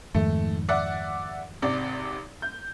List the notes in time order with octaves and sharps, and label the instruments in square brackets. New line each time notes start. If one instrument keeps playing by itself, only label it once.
[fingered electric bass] F2 G#2 D#3 [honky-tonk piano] A3
[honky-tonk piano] D5 E5 F#5
G#1 C3 D5
G6